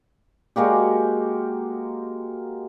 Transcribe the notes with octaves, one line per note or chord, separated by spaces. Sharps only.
G#3 A#3 F#4 G4